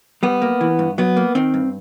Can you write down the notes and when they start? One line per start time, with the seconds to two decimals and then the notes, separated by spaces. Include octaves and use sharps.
0.23 G3 B3
0.42 A#3
0.61 E3
0.79 G2
0.98 F#3 B3
1.16 A#3
1.35 D#3 C4
1.54 G2